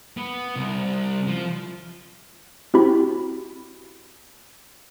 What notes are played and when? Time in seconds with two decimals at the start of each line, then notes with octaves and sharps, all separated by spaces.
0.17 B3
0.56 C2
1.27 F3
2.74 C4 E4 F#4 G4 B5